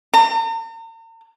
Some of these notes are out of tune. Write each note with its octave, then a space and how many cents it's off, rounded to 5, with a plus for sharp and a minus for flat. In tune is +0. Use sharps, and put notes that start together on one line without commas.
A#5 -45